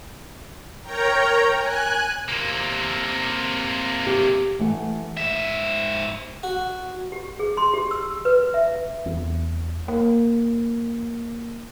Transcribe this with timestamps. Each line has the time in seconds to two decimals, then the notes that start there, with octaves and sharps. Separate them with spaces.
0.83 A#4 C#5 G5 A#5
1.57 G#5 F#6
2.29 C3 A#3
4.07 G4
4.59 E3 A3 F#5
5.17 G#2 E5
6.43 F#4
7.12 G4
7.39 G#4
7.57 C6
7.74 G4
7.91 E6
8.25 B4
8.54 E5
9.06 E2
9.88 A#3